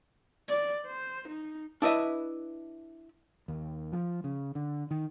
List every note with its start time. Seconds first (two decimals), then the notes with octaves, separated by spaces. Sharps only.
0.48 D5
0.86 C5
1.29 D#4
1.82 D4 E4 B4 D#5 E5
3.48 D#2
3.92 F3
4.24 C#3
4.55 D3
4.91 D#3